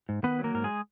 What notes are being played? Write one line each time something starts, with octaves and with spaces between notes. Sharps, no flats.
G#2
D#3 B3 B4
F#3
A#3 A#4
G#2 A#4
G#3 G#4